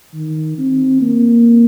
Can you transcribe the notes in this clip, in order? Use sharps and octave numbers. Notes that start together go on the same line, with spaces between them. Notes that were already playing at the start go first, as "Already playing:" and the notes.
D#3
C4
A#3